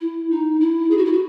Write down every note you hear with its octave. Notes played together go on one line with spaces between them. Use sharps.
E4
D#4
E4
G#4
F#4
E4
F#4